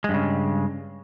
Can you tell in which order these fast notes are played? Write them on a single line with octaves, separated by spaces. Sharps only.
G#3 G2 C#3